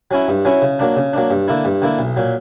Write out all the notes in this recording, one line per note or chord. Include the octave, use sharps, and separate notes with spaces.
F#3 C#4 E4
G2
F#3 C#4 E4
C#3
F#3 A#3 D4
C#3
F#3 A#3 D4
G2
D3 A#3 E4
G2
D3 A#3 E4
B1
A#2 F#3